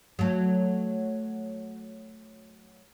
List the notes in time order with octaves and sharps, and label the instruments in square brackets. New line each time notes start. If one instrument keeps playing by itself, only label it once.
[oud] F#3 A3